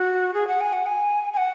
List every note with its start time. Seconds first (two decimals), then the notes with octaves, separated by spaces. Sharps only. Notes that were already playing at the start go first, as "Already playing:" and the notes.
Already playing: F#4
0.34 G#4
0.48 F#5
0.60 G#5
0.73 F#5
0.86 G#5
1.33 G#5
1.37 F#5